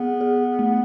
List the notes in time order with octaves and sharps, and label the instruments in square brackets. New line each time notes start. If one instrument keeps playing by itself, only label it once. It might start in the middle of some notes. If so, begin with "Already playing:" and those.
Already playing: [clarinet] B3 [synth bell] G#4
[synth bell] G#4
A3